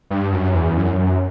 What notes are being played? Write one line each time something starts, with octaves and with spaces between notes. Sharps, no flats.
G2
F#2
E2
F#2
F#2